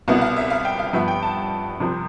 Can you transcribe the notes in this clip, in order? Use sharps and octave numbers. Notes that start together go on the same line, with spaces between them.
C2 B2 B3 E4 F5
F5
E5
F5
G5
F5
G2 F3 B3 E5
G5
A5
C2 C3 F3 C4